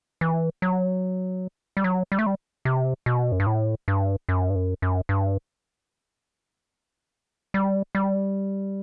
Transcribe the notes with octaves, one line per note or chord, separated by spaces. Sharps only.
E3
F#3
G3
F#3
G3
A3
G3
C3
B2
F#2
G2
A2
G2
F#2
G2
F#2
F#2
G2
G3
G3